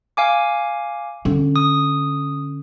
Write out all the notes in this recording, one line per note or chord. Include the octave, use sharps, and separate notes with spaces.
F5 G#5 D6
D3 C#4
D#6